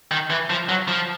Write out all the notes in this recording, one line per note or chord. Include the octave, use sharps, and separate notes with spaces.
D#3
E3
F3
F#3
F3